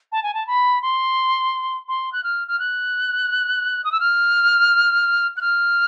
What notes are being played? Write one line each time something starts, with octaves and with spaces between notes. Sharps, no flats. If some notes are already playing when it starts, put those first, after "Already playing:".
A5
G#5
A5
B5
C6
C6
F#6
F6
F6
F#6
D#6
E6
F6
F#6
F6